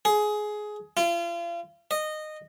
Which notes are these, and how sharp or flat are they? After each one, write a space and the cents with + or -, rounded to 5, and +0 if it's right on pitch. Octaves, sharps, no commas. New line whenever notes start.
G#4 +15
F4 -35
D#5 -15